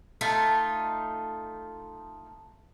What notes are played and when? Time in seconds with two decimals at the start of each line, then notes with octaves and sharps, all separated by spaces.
0.21 A3 D#4 F4